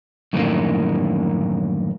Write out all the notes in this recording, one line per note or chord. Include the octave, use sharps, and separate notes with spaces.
F#2 A2 D3 D#3 F3 A#3